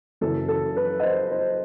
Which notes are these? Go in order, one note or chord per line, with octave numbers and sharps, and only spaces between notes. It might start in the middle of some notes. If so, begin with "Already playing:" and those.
F#1 F#2 E3 A4
A4
B4
D#5
C5
C5